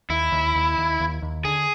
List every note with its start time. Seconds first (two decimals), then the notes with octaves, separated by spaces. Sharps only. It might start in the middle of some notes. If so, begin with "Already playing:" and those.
0.10 D#2 E4
0.32 D#2
0.55 D#2
0.78 D#2
1.00 D#2
1.22 D#2
1.44 D3 G#4